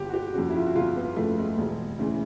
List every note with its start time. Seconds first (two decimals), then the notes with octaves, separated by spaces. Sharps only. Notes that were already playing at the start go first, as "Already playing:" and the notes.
Already playing: G1 G4
0.09 F#4
0.14 G4
0.34 F2 C#3 F#4
0.49 E4
0.55 F4
0.66 F#4
0.75 G1 F4
0.96 B3
1.16 F2 C#3 A3
1.38 G#3
1.58 E1
1.99 D2 C#3 E3